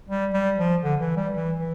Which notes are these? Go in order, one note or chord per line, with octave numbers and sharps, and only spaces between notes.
G3
G3
F3
D3
E3
G3
E3
E3